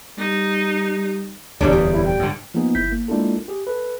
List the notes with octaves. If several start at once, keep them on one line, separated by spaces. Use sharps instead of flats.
G3 D#4
D1 E2 C3 G3 C#4 D4 G#4
G3
E4
G5
G#2 D3
F3 A#3 B3 D#4 G#4
G1 E4 G6 B6
A#3
G#3 A#3 D4 E4 F4 A4
G4 G#4
A4 B4